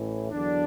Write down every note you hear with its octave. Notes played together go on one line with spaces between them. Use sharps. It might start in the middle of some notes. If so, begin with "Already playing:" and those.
Already playing: A1 A2 E3
E2 D3 F#3 D4